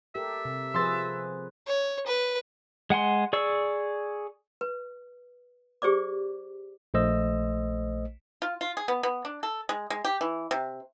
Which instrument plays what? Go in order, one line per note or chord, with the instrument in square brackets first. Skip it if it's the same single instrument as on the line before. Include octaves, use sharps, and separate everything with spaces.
[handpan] G4 A4 A#4 [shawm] E5
[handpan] C3
[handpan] F3 G#4 B4 [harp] C6 E6 A6
[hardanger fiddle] C#5
B4
[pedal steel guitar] G#3 F#5 G#5 C6
G#4 D5 C#6 E6
[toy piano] B4
G4 G#4 C5 D5 D6
[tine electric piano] A#1 A3 C5 D#5 E6
[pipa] F4
F4
G#4
B3
B3
D4
A4
G#3
G#3
G4
E3
C3